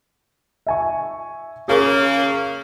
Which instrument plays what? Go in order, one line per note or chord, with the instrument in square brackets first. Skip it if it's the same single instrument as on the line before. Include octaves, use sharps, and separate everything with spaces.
[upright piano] E5 G#5 C#6
[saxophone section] C#3 A#3 [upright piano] G#4 A#4